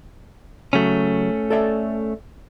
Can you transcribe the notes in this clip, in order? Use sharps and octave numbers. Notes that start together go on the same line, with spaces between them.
C#3 F#3 A3 C#4
A4 D5 E5